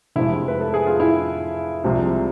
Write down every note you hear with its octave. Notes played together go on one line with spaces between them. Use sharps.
F1 F2 C3 E3 G#3 E4
B4
A4
G#4
F4
E4
C2 C3 F3 G#3